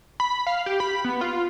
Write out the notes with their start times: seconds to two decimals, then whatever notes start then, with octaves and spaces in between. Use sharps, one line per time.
0.20 B5
0.47 F5
0.66 G4
0.80 B5
1.04 B3
1.21 F4